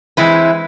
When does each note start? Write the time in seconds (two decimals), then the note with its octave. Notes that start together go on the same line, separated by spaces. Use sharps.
0.17 E3 G#3 C4 E4 B4